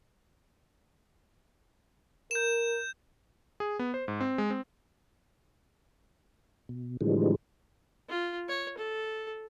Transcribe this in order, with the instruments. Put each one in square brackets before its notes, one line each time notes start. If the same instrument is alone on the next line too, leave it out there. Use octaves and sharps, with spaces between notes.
[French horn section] A#4 [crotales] G6 E7
[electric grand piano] G#4
B3
C5
G#2
C4
G#3
C4
[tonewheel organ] B2
A2 D3 E3 F3 G3 G#3
[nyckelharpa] F4
C#5
A4